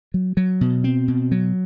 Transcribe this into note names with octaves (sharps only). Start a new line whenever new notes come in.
F#3
F#3
B2
C4
B2
F#3